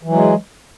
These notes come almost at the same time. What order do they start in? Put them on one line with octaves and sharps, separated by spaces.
E3 F#3 G#3